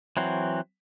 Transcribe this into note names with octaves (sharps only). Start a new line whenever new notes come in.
E3 F#3 C4